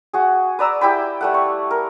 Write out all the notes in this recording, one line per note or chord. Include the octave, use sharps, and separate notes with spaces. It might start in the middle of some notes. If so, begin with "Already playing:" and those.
F#4 G#4
B4 D5 A#5 E6
E4 G4 G5 B5
G3 A3 F#5
C#6
A#4